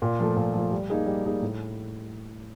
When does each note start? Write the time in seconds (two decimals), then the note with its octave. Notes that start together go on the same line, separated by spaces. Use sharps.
0.02 A#2
0.19 F3 A3
0.37 A#2
0.54 F3 A3
0.71 G3
0.90 A#3 D#4 G#4
1.06 G3
1.25 A#3 D#4 G#4
1.42 A2